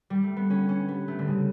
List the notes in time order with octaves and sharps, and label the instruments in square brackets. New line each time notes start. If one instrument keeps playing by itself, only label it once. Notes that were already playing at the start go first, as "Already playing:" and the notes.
[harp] G3
A3
B3
[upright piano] D3 [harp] C#4
[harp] C#4
[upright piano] G3 [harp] B3
[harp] A3
D3
[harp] C#3 [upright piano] G3